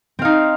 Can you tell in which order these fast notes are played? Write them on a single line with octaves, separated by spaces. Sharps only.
C4 F5 D#4